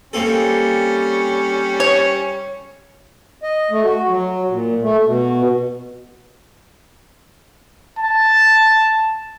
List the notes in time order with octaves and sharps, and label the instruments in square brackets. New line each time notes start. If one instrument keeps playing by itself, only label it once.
[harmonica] G3 C#4 [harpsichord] A#3 C4 A4
[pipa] C#5
[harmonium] D#5
A3
F#4
F#3
A#2
A3
B2
[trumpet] A5